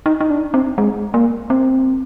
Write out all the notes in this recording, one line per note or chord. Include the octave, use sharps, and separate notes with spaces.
D#4
D#4
D4
C4
G#3
A#3
C4